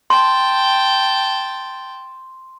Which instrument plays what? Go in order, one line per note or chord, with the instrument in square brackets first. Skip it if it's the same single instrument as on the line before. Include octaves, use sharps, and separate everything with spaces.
[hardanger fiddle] G5 A5 [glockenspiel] C6